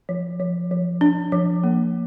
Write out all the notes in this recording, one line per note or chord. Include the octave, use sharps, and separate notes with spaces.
F3
F3
F3
D4
F3
A#3